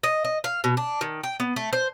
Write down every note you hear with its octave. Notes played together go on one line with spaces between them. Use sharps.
D#5
D#5
F5
B2
D4
D#3
G5
B3
A3
C5